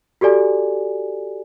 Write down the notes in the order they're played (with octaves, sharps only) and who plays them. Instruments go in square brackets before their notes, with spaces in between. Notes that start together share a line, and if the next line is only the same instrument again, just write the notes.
[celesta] F#4 G4 A4 D5 G#5